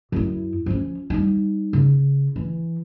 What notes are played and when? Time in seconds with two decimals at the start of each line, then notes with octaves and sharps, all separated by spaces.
0.12 F#2 E4
0.66 F3 C#4
1.10 G3 D#4
1.73 C#3
2.36 E3